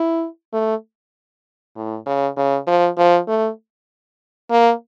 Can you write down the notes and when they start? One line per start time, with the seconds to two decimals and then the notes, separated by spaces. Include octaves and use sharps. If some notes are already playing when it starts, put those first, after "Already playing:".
Already playing: E4
0.53 A3
1.76 A2
2.06 C#3
2.36 C#3
2.67 F3
2.97 F3
3.28 A3
4.50 A#3